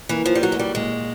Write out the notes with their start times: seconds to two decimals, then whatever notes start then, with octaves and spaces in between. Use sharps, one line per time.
0.09 E3 A#3
0.26 F3
0.35 G3
0.42 F#3 F#4
0.52 G#3
0.59 G3
0.75 A#2 G#3